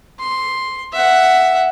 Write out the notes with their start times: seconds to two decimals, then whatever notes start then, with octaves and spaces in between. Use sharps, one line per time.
0.19 C6
0.93 E5 F#5